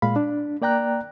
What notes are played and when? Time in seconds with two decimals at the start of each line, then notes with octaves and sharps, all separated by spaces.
0.02 A#2 G#3 F5 B5
0.16 D4
0.62 A#3 D5 G5 A#5 F#6